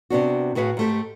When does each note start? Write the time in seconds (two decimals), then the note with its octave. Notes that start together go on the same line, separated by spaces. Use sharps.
0.10 C3 B3 D4 F#4
0.55 A2 F#4 G#4 B4 E5 F5
0.77 G#2 A3 G4